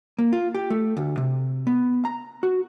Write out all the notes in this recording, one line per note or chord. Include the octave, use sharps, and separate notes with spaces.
A#3
F4
G4
A3
D2
C3
B3
A#5
F#4